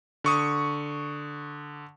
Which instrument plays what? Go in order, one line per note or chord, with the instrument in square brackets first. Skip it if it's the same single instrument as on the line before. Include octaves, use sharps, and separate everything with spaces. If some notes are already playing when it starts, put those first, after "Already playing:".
[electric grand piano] D3 C#6 D#6